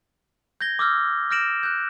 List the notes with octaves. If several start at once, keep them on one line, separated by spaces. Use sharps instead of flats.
G6 G#6 A#6 G7
D6 E6 F6 G6
F6 G6 A#6 D7 E7 F#7
F#6 G6